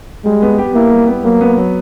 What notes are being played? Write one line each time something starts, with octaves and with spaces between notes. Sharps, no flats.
G3 G#3
B3
G4
A#3 E4
G3
B3
F#3 A#3
B3
F#3